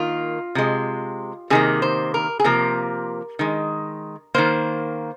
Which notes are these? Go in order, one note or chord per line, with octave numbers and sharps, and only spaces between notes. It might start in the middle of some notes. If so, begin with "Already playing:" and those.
Already playing: D#3 A#3 F4
C3 G#3
C3 D#3 A#3 G#4
C5
A#4
G#4
C3 F3 A#3 A#4
D#3 G#3
D#3 A#3 C5